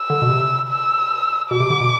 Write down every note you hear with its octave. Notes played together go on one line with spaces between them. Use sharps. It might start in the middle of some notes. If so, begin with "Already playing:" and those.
Already playing: E6
D3
B2
C3
E6
B2 D6
C3
D3
B2